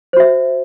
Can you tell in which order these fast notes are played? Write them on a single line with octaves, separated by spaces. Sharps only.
C5 F#4 E5